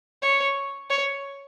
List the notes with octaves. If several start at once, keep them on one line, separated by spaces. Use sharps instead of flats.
C#5
C#5